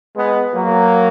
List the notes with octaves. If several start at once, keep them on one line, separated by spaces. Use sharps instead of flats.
G#3 B3
F#3 A#3